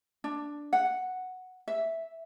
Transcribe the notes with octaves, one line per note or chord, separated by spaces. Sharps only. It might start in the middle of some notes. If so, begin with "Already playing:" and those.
D4
F#5
E5